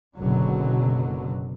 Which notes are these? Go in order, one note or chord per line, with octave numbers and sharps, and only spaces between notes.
F#1 B2 D3 F#3